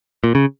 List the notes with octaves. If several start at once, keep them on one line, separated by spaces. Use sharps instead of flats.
A#2
C#3